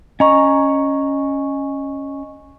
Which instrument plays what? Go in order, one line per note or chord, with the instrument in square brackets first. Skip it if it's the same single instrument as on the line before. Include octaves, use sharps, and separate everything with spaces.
[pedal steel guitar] C#4 A#5 [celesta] D#5 C#6